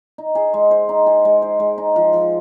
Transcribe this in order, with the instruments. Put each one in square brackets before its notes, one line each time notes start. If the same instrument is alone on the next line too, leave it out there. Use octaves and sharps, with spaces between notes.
[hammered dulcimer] D#4
G#4
G#3
C5
D#4
G#4
G#3
C5
G#3
D#4
F3
F3